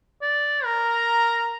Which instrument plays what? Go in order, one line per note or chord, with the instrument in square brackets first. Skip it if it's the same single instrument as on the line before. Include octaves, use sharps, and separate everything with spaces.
[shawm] D5
[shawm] A#4 [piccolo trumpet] A#5